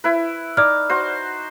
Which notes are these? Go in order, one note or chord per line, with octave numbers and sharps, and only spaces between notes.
E4 B4
D#4 D5 D6 F6
F#4 C5